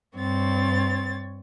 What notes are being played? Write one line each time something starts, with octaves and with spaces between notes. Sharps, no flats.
G2 C4 C#5 A6